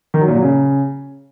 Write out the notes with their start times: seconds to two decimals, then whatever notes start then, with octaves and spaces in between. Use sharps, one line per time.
0.14 D#3
0.21 F#3
0.28 A#2
0.35 F#3
0.42 C#3